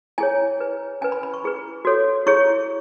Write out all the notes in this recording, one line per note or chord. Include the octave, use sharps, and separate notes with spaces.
E4 G#4 C#5 G#5
E4 G#4 B4
C#4 E4 B4 G#5
B5
B5
C#6
E4 G#4 B4
F#4 A4 C#5
E4 G#4 C#5 C#6